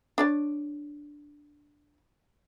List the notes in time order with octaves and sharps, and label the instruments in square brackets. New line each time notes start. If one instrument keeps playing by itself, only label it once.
[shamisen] D4 C#5 D5